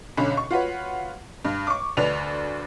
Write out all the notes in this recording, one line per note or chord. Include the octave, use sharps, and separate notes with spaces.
B1 D3 C#4 B5
C#6
F4 F#4 B4 C#5
G2
C#6 D6
D2 D4 B4 F7